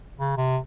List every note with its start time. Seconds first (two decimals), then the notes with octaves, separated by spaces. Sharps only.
0.18 C#3
0.37 C3